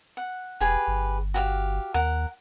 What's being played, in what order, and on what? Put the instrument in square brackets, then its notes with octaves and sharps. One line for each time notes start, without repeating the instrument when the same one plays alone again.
[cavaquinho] F#5
[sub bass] E1 [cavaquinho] G4 G#4 B4
[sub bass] G1
[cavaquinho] F#4 G4 F5
[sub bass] D#2 [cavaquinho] A#4 F#5